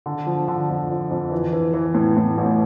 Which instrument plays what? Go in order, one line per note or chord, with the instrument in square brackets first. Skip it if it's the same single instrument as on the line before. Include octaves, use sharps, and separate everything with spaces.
[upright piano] D3
F3
D3
F2
F2
F2
E3
E3
E3
A2
A2
A1